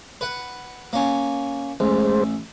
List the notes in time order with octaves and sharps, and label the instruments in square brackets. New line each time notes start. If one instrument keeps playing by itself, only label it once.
[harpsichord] B4 F#5
A#3 C#4
[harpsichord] A1 [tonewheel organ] G#3 C5